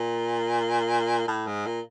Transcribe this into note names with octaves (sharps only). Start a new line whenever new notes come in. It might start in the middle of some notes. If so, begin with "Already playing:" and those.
Already playing: A#2
A2
G#2
A#2